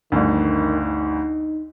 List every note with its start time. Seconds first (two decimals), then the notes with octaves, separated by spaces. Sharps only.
0.12 G1 D2 D#3
0.85 D#4